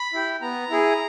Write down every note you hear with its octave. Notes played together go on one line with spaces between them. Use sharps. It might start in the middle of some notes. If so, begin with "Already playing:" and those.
Already playing: B5
E4 G4
B3 A#5
E4 G#4